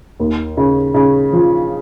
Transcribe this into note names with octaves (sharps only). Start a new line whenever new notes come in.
D#2
C#3
C#3
F3